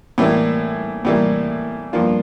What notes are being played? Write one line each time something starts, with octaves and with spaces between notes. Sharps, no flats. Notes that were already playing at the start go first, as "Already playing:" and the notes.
A2 E3 G3 A#3 E4
A2 E3 G3 A#3 E4
G2 F3 A#3 D4 F4